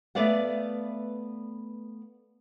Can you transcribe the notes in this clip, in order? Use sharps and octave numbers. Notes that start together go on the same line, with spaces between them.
A3 B3 B4 D5 F5 F#5